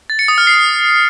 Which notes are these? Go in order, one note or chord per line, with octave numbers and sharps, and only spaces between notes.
A6
C#7
D#6
F6
C7